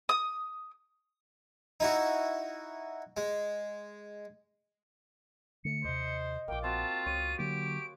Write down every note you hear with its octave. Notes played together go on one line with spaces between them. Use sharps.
D#6
D#4 E4 F#4
G#3
D3 A3 C#7
D#2 C3 C5 D#5
E1 A#1 A#3 G5 D6
C4 F4 F#4 A5 C6
C#2 C#5 D#6 D#7
D3 F#3 A#3 G4 D7